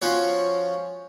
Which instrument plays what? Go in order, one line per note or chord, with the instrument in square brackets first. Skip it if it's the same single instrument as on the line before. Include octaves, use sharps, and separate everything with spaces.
[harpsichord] F3 C#4 F#4 C#5